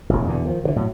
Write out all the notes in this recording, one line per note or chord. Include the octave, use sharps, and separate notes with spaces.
E1 A1
E2 B2 D3
D#3 F3
G2 D3 E3
A2 F#3